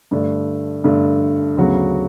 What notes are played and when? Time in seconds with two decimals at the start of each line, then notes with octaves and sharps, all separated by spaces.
0.11 G2 D3 A3 D4
0.84 G2 D3 A3 D4
1.57 D2 C#3 F#3 B3 F#4